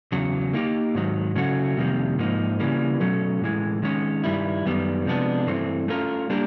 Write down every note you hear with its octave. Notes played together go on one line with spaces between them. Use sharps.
E2 C#3 F#3
A#3 D#4 G4
G#2 D#3 F#3
C#3 F#3 A3 C#4 F#4
F2 C3 D#3 G3 A#3
G#2 F3 A#3 D#4
C#3 E3 G3 A#3
B2 F#3 A3 C#4
A2 E3 G#3
D#3 G#3 C#4
G2 D#3 G3 E4
F#2 D#3 G3 B3
C3 F3 G#3 B3 D4
G2 E3 A3 C4
A3 C#4 F4 A#4
G3 A#3 D4 G4 A#4